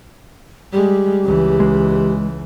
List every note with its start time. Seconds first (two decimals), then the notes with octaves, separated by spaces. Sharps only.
0.73 G3 G#3 G4
1.24 C#2 E3
1.60 G#3